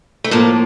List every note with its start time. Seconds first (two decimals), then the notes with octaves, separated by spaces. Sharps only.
0.24 A3
0.31 A2 F3 A#3